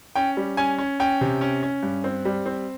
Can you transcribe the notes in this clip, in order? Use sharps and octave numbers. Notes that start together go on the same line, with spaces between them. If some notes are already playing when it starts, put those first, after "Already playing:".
C#4 G5
G3
C#4 G#5
C#4
C#4 G5
C3
C#4
C#4
G2
C4
G3
C4